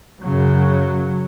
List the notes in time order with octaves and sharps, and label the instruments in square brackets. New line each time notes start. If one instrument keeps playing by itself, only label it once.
[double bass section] F#2 C#3 F#3